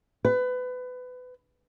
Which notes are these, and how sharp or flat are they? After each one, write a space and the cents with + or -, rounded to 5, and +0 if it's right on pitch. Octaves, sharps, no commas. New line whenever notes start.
B4 +25